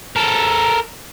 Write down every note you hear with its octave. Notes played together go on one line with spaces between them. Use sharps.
A4 A#4